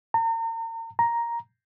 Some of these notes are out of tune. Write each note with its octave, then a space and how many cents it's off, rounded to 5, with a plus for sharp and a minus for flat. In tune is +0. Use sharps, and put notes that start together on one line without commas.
A#5 -40
A#5 +5